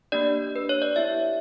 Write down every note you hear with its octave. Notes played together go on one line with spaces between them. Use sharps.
A#3 D4 G4 D5
B4
C#5
D5
B3 E4 G4 E5